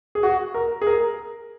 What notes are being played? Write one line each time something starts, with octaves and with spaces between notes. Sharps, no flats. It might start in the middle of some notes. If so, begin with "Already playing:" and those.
G#4
F#4
A#4
G#4
A#4